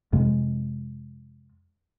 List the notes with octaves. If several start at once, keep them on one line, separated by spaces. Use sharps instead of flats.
F2 C3 G#3